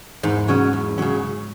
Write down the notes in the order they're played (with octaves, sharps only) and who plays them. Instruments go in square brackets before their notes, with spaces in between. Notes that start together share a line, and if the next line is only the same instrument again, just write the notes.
[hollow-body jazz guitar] E2 [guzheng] G#2
[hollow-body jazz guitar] C#3 F#3 C#4
E2
C#3 F#3 C#4